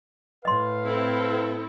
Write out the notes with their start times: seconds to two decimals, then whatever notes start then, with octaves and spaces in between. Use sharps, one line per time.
0.45 A2 B4 D#5 F5 C6
0.85 C4 E4 A4